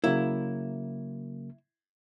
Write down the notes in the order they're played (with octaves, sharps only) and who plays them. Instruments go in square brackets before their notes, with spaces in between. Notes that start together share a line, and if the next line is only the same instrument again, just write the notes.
[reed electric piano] C#3 F#3 A#3 [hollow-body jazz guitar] E4